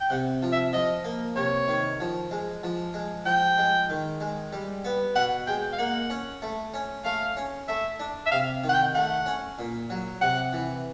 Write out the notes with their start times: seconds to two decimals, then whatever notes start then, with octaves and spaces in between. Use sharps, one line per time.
0.01 G5
0.10 C3 F#5
0.42 F3
0.52 E5
0.73 F3 D#5
1.04 A#3
1.36 C3 C#5
1.68 D#3
2.00 F3
2.31 G#3
2.63 F3
2.94 G#3
3.25 F3 G5
3.58 G#3
3.89 D#3
4.21 G#3
4.53 G3
4.85 B3
5.16 B2 F#5
5.47 G#3 G5
5.73 F5
5.78 A#3 F#5
6.10 C#4
6.42 A3
6.74 C#4
7.05 A3 F5
7.37 C#4
7.68 A3 E5
8.00 D4
8.26 E5
8.32 C3 F5
8.64 D#3
8.69 F#5
8.74 G5
8.95 A3 F#5
9.26 C#4
9.59 A#2
9.90 F#3
10.21 C3 F#5
10.53 E3